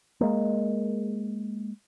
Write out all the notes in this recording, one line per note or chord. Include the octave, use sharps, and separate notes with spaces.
G#3 A#3